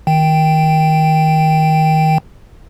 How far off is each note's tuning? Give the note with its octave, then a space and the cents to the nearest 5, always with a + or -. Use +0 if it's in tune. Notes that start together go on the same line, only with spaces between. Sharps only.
D#3 +20 G5 +0